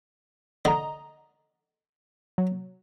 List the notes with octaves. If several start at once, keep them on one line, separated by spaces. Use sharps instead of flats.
D3 D#5 A#5
F#3